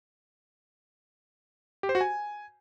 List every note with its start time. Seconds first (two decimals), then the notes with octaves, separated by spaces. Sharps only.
1.83 G4
1.89 C5
1.95 F#4
2.01 G#5